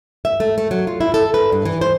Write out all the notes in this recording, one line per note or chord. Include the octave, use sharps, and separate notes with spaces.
E5
A3
A3
F#3
F4
E4
A4
B4
G2
E3
C5